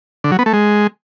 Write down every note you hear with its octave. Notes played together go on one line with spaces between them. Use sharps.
D3
F#3
B3
A3
G#3